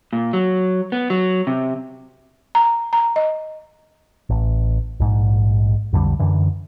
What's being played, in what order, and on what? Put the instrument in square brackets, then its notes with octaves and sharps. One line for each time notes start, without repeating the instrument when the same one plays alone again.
[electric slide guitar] A#2
F#3
B3
F#3
C3
[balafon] A#5
A#5
D#5
[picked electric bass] A1
A#1 G#2
B1 F2 D3 G3
F#2 D3 E3